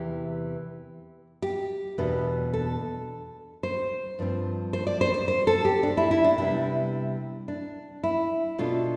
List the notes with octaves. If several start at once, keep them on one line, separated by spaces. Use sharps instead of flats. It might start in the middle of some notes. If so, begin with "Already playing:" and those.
Already playing: E2 C3 E3 G4
G4
E2 B2 B3 D4
A4
C5
G2 F3 C4
C5
D5
C5
C5
C5
A4
G4
D4
E4
E4
D4
C3 G3 B3 D4 E4
D4
E4
B2 A3 D4 F4